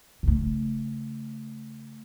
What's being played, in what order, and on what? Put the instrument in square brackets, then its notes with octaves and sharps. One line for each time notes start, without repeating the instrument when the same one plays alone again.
[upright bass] C#3 A3